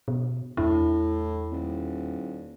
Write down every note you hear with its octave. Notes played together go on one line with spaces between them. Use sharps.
B2
E2 A2 D4 E4
D#1